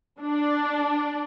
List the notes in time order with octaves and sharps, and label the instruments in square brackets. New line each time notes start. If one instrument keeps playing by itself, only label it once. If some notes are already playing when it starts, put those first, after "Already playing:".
[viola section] D4